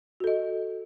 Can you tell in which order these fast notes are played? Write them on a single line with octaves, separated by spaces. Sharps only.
F#4 A4 D#5